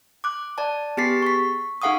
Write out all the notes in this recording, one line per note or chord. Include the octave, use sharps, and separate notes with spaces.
D6 F#6
D5 A5
B3 G4 G#4 A6 B6 C7
C#6 B6
D#4 G#4 F5 F#5 C#6 D#6